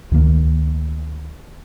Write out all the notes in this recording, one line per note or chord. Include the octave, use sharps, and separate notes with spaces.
D2 D#3 F#3 A#3